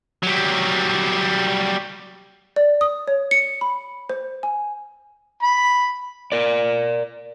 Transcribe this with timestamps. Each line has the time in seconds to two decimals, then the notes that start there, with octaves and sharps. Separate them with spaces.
0.23 F#3 G3
2.56 D5
2.81 D#6
3.08 C#5
3.31 C#7
3.61 B5
4.10 C5
4.43 G#5
5.43 B5
6.32 A#4 D5